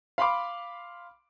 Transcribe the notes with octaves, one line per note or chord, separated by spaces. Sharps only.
F5 B5 C6 D6